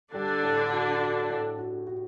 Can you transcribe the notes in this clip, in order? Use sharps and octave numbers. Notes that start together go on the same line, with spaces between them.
D3 G3 D4
A2
F#4
F#4
A2
F#4
F#4